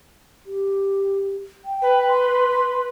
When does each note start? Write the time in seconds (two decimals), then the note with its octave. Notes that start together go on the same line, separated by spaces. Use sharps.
0.46 G4
1.65 G5
1.82 B4
2.08 C6